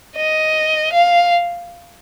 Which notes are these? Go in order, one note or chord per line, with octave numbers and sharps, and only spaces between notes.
D#5
F5